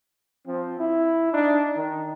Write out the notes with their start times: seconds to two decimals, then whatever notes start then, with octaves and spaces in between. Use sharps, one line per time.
0.47 F3 C4
0.80 E4
1.32 D4 D#4
1.76 D#3 D#4